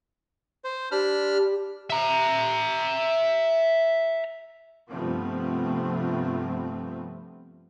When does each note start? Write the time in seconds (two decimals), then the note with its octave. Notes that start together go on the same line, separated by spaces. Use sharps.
0.64 C5
0.92 D4 G4 B5 F6
1.90 E5 A#5
4.90 G2 C3 F3 A3 B3 C4